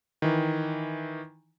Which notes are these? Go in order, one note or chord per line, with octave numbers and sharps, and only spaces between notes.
D#3 E3